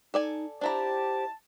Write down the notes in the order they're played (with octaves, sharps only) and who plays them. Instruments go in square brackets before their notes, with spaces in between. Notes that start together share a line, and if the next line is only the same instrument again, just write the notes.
[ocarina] D#4 [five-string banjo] A4 D5 G#5
[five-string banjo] D4 E4 A#5 [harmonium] G4 [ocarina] C5 [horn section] A5